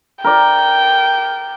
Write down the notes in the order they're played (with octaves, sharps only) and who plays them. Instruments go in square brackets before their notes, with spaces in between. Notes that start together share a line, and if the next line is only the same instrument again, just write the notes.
[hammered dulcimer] A#4 D5 [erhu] G5